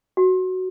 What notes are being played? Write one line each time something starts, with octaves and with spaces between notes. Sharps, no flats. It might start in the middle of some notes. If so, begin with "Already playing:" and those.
F#4